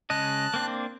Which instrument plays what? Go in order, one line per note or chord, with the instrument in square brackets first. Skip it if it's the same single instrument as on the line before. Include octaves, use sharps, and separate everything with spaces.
[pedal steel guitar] C#3 G#3 D#5 [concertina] A5 F#6
[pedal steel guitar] A#3 C4 D4